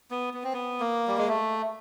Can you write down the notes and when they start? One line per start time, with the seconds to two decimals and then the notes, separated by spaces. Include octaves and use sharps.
0.11 B3
0.34 B3
0.44 C4
0.53 B3
0.80 A#3
1.08 G3
1.18 G#3
1.28 A3